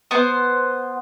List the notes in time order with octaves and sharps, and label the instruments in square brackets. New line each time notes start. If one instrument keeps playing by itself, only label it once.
[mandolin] B3 C5